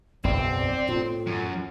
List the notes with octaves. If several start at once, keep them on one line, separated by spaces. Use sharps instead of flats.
F#1 B1 E2 C4 D5
A2 F4
F#2